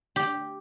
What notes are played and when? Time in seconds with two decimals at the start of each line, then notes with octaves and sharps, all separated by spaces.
0.16 G4